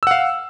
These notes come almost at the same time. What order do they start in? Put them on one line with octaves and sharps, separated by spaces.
E6 F#5 F5